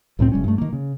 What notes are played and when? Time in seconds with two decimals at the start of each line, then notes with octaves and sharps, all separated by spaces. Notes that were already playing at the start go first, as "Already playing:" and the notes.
0.19 C#2 A2 A3 C4
0.32 F1 G3 C#4
0.44 G2 A3
0.58 D#3 A#3
0.73 C#3